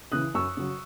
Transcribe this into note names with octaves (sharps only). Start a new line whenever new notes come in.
C#3 E3 D#6 F#6
F#2 C#6 E6
C#3 F#3